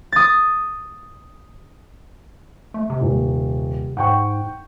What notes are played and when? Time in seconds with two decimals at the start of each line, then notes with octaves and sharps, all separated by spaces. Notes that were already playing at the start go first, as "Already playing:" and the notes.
0.12 D#6 A6
2.74 A3
2.90 C3
3.01 D#1
3.97 G#2 F#5 G5 C#6